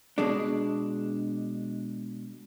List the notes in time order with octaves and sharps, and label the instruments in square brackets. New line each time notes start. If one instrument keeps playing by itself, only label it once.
[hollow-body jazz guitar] B2 G#3 D4